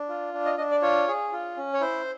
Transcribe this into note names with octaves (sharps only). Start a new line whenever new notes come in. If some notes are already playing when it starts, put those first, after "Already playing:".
Already playing: D4
F4
D4
D#5
D4 D#5
D5
F4 C#5
G#4
F4
C#4
C#5
E4 C5